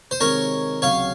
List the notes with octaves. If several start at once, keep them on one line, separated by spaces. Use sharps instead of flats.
C5
C3 D#3 G#3 C4 A#4 C#5
C#2 C3 F#3 C#5 F5